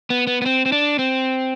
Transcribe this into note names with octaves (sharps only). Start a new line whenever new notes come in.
B3
B3
B3
C4
C4
D4
C4